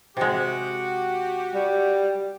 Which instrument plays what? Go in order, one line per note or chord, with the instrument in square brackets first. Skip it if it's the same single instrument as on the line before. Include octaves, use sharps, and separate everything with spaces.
[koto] C3 G#3 [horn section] F#4 G4
[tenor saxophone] G3